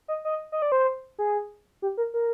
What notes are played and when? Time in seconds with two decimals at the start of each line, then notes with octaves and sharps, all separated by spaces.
0.08 D#5
0.25 D#5
0.52 D#5
0.62 D5
0.72 C5
1.19 G#4
1.82 G4
1.97 A#4
2.14 A#4